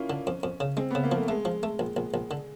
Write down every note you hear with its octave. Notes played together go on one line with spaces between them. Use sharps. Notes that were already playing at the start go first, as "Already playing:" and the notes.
Already playing: A#3 C#4 E4 F4
D3
F2
F2
C#3
G#3 C4
C#3 B3
A#3
F3 A3
G#3 A3
F3
A3
A#1
A#1
A#1
D3